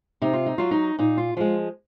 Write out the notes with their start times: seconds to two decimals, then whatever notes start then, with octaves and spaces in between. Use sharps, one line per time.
0.22 C3 D#4
0.33 F4
0.46 D#4
0.58 F#3 F4
0.71 D#4
0.98 A#2 D#4
1.17 F4
1.37 F3 G#3 F4